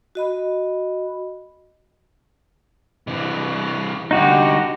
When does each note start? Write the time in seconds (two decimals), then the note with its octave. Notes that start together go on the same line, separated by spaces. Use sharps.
0.15 F#4 D#5 B5
3.07 C3 E3
4.11 C2 D3 D#4 F#4 G4